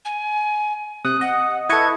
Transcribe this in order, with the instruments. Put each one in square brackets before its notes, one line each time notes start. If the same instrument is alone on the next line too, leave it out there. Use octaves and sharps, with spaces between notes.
[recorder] G#5
[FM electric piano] C3 [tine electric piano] D#6 [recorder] F#6
[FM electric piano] D#5 [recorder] F#5
[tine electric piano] E4 A4 [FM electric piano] B4 D#5 C#6 [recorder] G#6